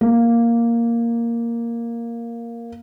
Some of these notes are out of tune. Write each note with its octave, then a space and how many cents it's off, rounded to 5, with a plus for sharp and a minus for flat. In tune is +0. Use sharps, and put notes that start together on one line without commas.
A#3 +0